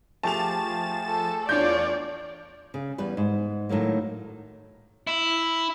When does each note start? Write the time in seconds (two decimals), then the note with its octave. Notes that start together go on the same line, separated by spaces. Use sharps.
0.23 F3 A3 G4 G#4 A5 A6 E7 F7
1.06 A4
1.49 E2 D4 F4 C#5 D5 G6
2.74 C#3
2.98 E2 G3 B4
3.17 G#2
3.69 A2 D#3 F#3 A#3
5.07 E4